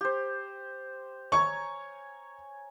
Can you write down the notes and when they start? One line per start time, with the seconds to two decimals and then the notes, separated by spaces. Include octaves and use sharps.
0.01 G4 C5
1.32 C#5 G#5 A#5 C#6